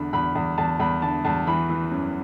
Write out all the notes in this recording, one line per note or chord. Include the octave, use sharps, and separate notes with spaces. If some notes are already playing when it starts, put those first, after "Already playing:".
Already playing: E2 D3 B5
E2 B5
E2
E2 A5
E2 B5
D3 A5
E2 A5
E3 B5
E3
F#2